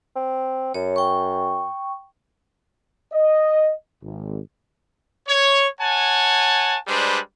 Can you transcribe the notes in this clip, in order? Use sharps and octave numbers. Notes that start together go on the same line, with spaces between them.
C4
F#2 C#5
G5 C#6
D#5
G#1
C#5
C#5 F#5 G#5 A5
G3 G#3 D4 B4 C5